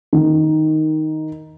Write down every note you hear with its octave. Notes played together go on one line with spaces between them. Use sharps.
D#3